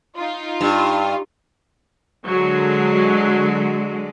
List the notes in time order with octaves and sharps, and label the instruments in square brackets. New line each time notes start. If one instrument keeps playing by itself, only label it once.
[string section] D#4 F4
[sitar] G2
[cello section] D3 G#3 [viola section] F#3